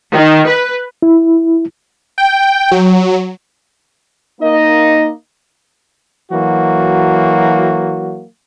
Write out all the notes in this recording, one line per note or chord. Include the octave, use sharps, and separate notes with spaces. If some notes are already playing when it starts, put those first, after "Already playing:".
D#3
B4
E4
G5
F#3
A#3 D#4 D#5
E3 F#3 A#3 F#4